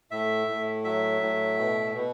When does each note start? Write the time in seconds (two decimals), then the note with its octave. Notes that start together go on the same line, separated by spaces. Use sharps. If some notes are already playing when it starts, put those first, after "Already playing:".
0.11 A2 E5
0.48 A2
0.84 F#3 E5
1.22 A2
1.59 B2
1.95 B2